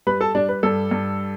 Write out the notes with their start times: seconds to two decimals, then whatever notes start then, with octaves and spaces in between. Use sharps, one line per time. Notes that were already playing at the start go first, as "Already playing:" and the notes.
0.07 G3 B4 B5
0.21 A4 A5
0.35 G3 D4 D5
0.49 B4
0.63 G2 A4
0.91 G2